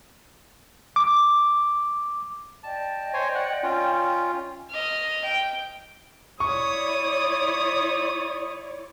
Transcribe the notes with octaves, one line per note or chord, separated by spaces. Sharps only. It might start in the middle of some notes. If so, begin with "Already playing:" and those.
D6
D5 D#5 G5 A5
C5 C#5 G#5
F#5
C#4 F4
D#5 F6
G5
E4 C#5 D5 B5 C#6 D#6